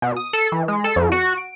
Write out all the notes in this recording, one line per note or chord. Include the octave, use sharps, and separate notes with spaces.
B2
D#6
A4
E3
G#3
A4
F2
F#4
D7